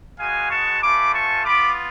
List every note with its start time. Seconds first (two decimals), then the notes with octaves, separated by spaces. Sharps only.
0.19 G#3 B3 F#4 F5 G#5
0.51 A5 C#6
0.82 A3 C#4 F4 B5 D6
1.13 A5 C#6
1.45 B3 F4 B5 D6